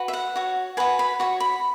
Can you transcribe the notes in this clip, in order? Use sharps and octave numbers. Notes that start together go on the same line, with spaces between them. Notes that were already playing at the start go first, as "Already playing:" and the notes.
Already playing: F#4 B4
E5
F#5
F#4 C#5
F#4 B4 G#5
B5
F#4 C#5 C#6
B5